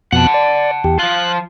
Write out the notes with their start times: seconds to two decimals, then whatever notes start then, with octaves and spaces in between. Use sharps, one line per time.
0.12 F2 B2 F#5 A5 F#6
0.34 D5
0.84 E2 G4
0.99 F3 F4 F#6